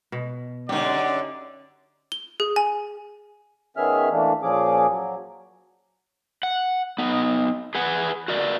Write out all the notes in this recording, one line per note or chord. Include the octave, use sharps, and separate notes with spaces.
B2
F#2 D3 C#4 D#4 G4 D5
G7
G#4
G#5
D#3 B3 C#4 G#4 E5 F6
E3 A3 A#3 D4
A#2 F3 C#4 G#4 D6
F#3
F#5
B3 D#4
G#4 B4 F#5
F#4 A#4 D5